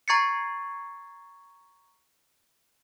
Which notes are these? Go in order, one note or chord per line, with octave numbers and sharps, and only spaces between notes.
A#5 C#6 G#6 A6 C7 C#7